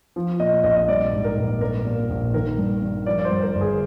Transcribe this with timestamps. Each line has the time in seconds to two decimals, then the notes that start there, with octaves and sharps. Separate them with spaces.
0.16 F3
0.40 A#2 D#5
0.63 A#1 D#5
0.76 D#5
0.88 G3 D5
1.12 G#2
1.24 A#4
1.37 A#1
1.60 G3 A#4
1.85 A#2
2.10 A#1
2.34 D#3 A#4
2.58 G2
2.81 G3
3.06 F3 D5
3.19 D5
3.24 C5
3.31 G2
3.42 A#4
3.55 G1
3.61 G#4